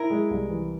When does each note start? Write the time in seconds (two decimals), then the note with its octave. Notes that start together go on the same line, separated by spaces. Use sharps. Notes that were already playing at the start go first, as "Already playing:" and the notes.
Already playing: E4 A#4
0.10 G#3
0.31 C2
0.49 E3